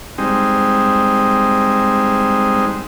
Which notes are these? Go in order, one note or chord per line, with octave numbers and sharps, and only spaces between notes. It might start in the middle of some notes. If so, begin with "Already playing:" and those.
G3 G#3 C4 D#4